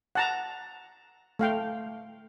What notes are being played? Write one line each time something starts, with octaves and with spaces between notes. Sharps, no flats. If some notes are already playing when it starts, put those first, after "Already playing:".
F#5 A5 A#5
A3 F5 G5